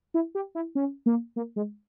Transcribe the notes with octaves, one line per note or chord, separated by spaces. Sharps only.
E4
G4
E4
C#4
A#3
A#3
G#3